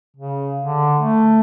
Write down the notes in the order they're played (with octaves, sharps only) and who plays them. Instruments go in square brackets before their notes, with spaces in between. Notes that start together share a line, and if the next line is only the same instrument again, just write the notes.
[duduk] C#3
D3
A3